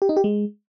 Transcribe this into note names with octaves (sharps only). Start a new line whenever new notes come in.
G4
D#4
G4
G#3